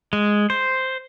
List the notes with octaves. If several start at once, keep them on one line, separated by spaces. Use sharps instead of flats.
G#3
C5